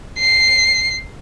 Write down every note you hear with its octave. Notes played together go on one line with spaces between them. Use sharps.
C7